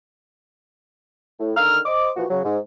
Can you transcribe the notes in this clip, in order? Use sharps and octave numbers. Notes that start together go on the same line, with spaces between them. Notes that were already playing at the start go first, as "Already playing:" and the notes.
A2
D3 D#3 A#5 E6 F6
C5 D#5 D6
A#2 E3 F3 F#4
C#3 F#3
G#2